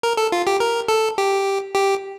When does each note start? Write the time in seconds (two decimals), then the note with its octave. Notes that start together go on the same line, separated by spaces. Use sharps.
0.03 A#4
0.17 A4
0.32 F4
0.47 G4
0.60 A#4
0.88 A4
1.18 G4
1.75 G4